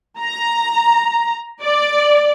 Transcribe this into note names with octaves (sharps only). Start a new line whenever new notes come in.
A#5
D5